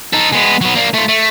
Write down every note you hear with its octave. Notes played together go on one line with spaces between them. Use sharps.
D#4 A4
G#3 B3
F#3 B3
A#3 D4
A3 F4
A3